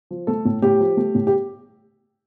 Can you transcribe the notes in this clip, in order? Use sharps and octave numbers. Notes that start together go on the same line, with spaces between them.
F3
A3 A4
A2
A2 G4
F3
A3
A2
G4